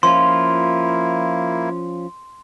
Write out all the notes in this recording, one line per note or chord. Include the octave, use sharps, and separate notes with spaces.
F3 A#3 C#4 E4 F4 C6